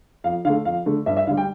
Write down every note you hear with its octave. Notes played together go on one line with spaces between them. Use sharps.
F2 F5
D3 A3 F5
F2 F5
D3 A3
G2 E5
E5
D3 G3 F5
G5